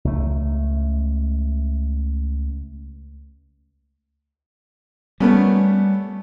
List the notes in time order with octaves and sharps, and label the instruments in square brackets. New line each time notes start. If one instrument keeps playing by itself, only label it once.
[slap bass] C#2 A3
[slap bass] G3 [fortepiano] A3 B3 C#4